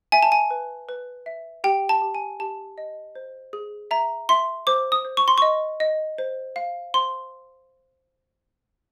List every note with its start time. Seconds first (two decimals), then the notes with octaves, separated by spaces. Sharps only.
0.12 E5 G#5
0.23 A5
0.32 G#5
0.50 B4
0.89 B4
1.26 E5
1.64 G4 G5
1.89 A5
2.02 G4
2.15 G#5
2.40 G4 A5
2.78 D#5
3.15 C5
3.53 G#4
3.91 E5 A#5
4.29 E5 C6
4.67 C5 D6
4.92 D#6
5.05 C5
5.17 C#6
5.28 C6
5.38 D#5 C#6
5.80 D#5
6.18 C5
6.56 F5
6.94 C5 C6